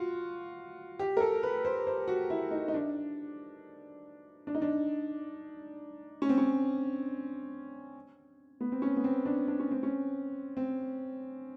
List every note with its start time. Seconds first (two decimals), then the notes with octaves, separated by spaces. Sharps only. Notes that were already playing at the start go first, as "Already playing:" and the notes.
Already playing: F4 F#4
0.99 G4
1.17 A#4
1.20 A4
1.43 B4
1.65 C5
1.87 C5
2.08 F#4
2.30 E4
2.51 D#4
2.68 D#4
2.74 D4
4.47 D4
4.55 D#4
4.62 D4
6.22 C#4
6.29 C4
6.38 C#4
8.61 B3
8.72 C4
8.82 C#4
8.96 B3
9.04 C4
9.25 D4
9.48 D4
9.59 C#4
9.71 C4
9.83 C#4
10.57 C4